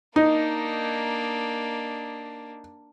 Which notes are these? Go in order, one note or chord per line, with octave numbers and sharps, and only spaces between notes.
A#3 D4 D#4